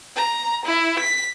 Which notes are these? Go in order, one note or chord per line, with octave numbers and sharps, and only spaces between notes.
A#5
E4
B6